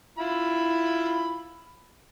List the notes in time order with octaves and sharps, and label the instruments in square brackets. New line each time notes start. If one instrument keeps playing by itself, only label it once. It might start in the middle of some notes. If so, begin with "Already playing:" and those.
[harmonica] E4 F4 B5